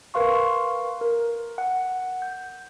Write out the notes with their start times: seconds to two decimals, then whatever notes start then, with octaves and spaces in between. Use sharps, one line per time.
0.14 A#4 B4 F5 C6 C#6
1.01 A#4
1.58 F#5
2.22 G6